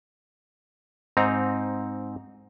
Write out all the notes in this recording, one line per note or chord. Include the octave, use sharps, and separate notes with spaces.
G#2 C4 D#4 A#5